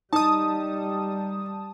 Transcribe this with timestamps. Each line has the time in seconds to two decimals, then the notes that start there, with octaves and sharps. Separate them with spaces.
0.13 G3 D#4 A5 D#6